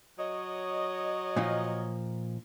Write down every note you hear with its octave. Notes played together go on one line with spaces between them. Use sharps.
F#3 C#5 D#5
A#2 F3 D#4